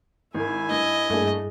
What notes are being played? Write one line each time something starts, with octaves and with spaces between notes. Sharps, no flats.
G#1 E4 A#4 G#5
G2 D#5
G2 A3 A#3 D4 G#4